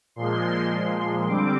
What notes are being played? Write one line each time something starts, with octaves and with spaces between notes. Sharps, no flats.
A#2 F3 G#3 C6
D3 G3 C4 D6